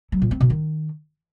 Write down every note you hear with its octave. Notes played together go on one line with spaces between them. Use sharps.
F#3
A#2
C4
B2
D#3